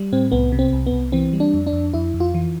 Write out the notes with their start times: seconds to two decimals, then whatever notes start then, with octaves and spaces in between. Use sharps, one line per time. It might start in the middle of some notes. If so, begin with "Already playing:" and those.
Already playing: G3
0.13 A2 C4
0.32 C2 B3
0.52 C3
0.59 C4
0.73 C2
0.87 B3
0.92 C2
1.12 E3 C4
1.33 G3
1.40 D4
1.54 F2
1.67 D4
1.73 F2
1.94 F2 E4
2.14 F2
2.20 F4
2.34 E3